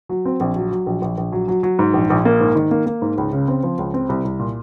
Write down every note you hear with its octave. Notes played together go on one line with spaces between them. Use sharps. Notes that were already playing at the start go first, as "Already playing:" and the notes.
F#3
C4
A#1
F#3
F#3
A#1
A#1
A#1
F#3
F#3
F#3
G#2
A#1
A#1
A#3
G#2
D#3
A#3
A#3
G#2
C#2
C#3
C4
F3
C#2
C4
C2
C2
A#2